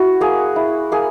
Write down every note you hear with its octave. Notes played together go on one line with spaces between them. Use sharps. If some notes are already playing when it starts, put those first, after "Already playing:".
Already playing: E4 F#4
A#3 G#4
E4
A#3 G#4